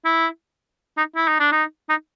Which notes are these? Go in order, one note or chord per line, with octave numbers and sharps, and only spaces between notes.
E4
D#4
E4
D#4
D4
D#4
D#4